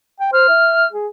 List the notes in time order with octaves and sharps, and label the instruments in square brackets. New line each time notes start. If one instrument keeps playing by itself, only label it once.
[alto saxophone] G5
[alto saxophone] C5 [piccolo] F6
[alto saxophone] E5
G#4